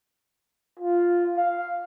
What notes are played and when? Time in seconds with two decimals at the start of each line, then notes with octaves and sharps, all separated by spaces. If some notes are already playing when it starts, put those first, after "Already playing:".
0.80 F4
1.37 F5